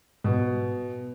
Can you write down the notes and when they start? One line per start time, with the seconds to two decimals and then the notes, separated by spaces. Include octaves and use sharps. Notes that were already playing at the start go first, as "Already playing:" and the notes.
0.24 B2